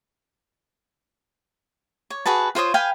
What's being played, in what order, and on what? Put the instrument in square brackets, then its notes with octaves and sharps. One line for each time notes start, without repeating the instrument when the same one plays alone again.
[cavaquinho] C#5
F#4 G#4 B4 A5
F4 C5 C#5 D#6
B4 F5 G5 G#5